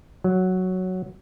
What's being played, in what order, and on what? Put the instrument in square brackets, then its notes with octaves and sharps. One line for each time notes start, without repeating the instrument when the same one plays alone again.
[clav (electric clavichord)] F#3